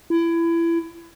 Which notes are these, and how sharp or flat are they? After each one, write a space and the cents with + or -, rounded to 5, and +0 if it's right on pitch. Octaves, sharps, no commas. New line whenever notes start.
E4 +25